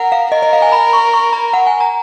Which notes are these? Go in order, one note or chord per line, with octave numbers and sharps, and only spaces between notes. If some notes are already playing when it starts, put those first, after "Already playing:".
Already playing: A#4 F#5
F5
A#4 D#5
D#5
F5
G#5
B5
C#6
C#6
A#5
F#5
G#5
A#5